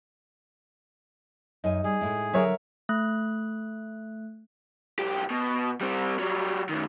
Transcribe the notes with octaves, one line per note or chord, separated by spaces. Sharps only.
F#2 D#4 G#5
G3 G#4
A2 G#3 E4
D3 F#3 A#4 C#5 E5
A3 F#6
B1 G4
B2
G3 C4
F#3 G3
F#2 D#3